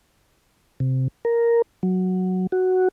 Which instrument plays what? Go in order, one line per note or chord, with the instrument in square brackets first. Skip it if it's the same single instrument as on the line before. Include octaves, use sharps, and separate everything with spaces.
[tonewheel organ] C3
A#4
F#3
F#4